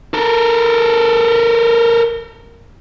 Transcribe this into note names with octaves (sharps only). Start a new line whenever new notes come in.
A4 A#4